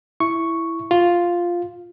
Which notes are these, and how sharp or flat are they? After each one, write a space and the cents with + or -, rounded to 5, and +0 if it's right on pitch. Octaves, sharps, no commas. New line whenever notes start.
E4 +5 C#6 +0
F4 +0 F5 +0